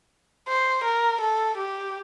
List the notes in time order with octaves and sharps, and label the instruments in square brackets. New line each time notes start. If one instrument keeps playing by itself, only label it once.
[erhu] C5
A#4
A4
G4